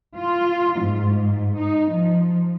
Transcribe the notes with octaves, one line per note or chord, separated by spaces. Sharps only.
F4
G#2
D#4
F3